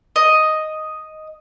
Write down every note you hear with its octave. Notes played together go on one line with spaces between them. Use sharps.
D#5